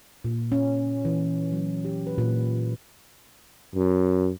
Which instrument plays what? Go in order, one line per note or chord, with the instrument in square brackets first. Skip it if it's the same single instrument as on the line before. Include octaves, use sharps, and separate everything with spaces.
[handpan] A#2
C#4
E3
F#3
G4
B4
A#2
[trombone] F#2